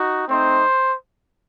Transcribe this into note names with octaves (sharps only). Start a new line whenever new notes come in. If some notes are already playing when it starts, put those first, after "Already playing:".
Already playing: D#4 F#4
A3 C4 D#4 C5